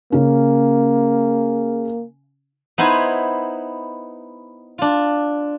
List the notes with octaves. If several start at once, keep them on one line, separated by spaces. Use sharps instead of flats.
C#3 A#3 C#4
B3 D#4 E4 C5 G#5
D4 F4